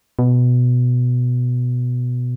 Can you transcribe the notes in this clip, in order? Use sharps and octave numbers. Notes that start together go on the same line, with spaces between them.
B2